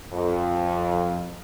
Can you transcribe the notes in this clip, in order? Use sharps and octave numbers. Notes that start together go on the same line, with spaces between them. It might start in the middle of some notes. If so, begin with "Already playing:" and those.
F2